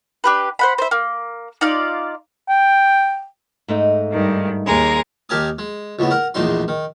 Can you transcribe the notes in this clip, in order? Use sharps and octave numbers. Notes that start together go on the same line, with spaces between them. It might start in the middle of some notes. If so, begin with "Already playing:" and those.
D4 G4 B4
C5 F#5 B5
C5 E5
A#3
D#4 F4 D5 F5
G5
G#2 A3 D#4
G2 D#3
D#2 G#3 A#4
D#2 G4 A#4 G#5 A5 D#6
G#3
C#2 A2 B3
A#4 F#5
A#1 E2 A2 E3 D#4 C6
D#3